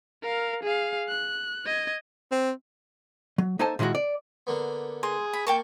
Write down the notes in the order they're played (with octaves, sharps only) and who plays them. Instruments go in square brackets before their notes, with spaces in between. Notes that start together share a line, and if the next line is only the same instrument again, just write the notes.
[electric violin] A#4 F5
G#4 F5
F#6
D#5 G#6
[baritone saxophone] C4
[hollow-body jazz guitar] F#3
A#3 D#4 A4 C5 G#5 A5
A#2 D#3 G#3 E4 F#4
D5
[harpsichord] D3 A#3 B3
[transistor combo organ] G#4 [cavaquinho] C6
[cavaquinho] B5
[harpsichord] A#3 [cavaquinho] G5 A5 C#6